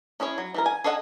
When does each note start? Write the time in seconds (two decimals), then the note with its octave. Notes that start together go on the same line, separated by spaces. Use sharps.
0.20 C#4 E4 G#4 C#5
0.38 F#3
0.54 E3 E4 A#4
0.66 G#5
0.84 G#4 A4 C#5 D#5 F#5